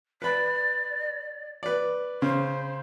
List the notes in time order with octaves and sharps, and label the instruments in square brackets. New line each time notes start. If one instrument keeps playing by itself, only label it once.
[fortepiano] B4 B5 [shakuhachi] D5
[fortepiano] B4 D5
[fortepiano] C#3 [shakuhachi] C5